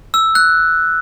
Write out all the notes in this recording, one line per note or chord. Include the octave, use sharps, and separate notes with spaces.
E6
F#6